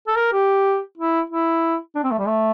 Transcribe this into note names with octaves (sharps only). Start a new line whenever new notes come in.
A4
A#4
G4
E4
E4
D4
C4
A3
G3
A3